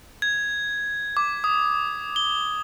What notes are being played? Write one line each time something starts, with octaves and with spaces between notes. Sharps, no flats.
G#6
D6
D#6
G7